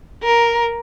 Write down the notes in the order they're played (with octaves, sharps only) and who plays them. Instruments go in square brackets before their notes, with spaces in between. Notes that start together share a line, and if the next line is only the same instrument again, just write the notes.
[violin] A#4